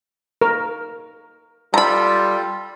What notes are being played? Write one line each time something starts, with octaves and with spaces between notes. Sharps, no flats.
A#4
G3 F4 A4 A#5 B5